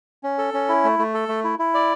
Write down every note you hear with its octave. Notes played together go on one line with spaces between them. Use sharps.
C#4
A4
C#4
E4
A3
A3
A4
A3
E4
E4
D5